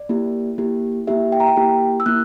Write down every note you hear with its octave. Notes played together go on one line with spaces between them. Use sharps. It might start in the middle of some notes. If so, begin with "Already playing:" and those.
Already playing: D5
A#3 E4 G4
A#3 E4 G4
A#3 E4 G4 E5
G5
A#5
G5
A#3 E4 G4
E6
A#3 E4 F#6